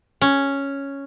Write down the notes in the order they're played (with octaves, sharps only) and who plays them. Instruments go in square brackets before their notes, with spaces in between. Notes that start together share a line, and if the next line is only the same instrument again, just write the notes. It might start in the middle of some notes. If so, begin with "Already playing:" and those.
[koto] C#4